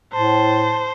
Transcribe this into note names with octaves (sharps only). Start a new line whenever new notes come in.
A2 C5 A5